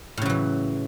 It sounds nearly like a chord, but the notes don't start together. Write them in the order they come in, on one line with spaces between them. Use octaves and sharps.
A2 C#3 F#3 E3